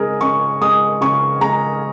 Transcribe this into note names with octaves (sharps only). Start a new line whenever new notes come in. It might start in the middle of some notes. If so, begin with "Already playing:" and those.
Already playing: C#3 G#3 G#4 A#4
C#3 C#6
G#3 D#6
C#3 C#6
G#3 A#5